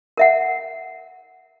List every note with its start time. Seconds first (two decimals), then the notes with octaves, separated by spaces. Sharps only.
0.17 A#4 E5 F#5